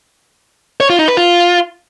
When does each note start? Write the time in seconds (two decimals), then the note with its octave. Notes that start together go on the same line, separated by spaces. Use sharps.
0.80 C#5
0.90 F4
0.99 D#4
1.08 B4
1.17 F4